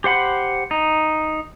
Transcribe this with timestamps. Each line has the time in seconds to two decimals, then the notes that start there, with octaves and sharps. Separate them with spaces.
0.04 G4 C5 F#5 B5
0.71 D#4